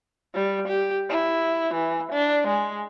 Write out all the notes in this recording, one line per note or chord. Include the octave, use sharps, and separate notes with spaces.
G3
G4
E4
E3
D4
G#3